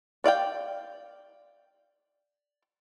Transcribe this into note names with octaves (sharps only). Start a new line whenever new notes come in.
D4 D5 F5 G5